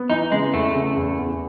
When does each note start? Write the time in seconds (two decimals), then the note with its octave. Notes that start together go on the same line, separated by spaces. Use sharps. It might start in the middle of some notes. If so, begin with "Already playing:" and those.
Already playing: B3
0.10 E3 D#4
0.32 C#3 G#3
0.53 E2 A3
0.75 C#3
0.96 E2
1.18 E2